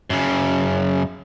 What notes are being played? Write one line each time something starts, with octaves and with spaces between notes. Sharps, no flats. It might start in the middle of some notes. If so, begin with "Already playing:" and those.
F#2 C#3